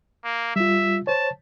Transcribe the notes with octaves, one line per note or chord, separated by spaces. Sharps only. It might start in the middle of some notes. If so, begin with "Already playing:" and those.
A#3
G3 F4 E5
C5 C#5 A5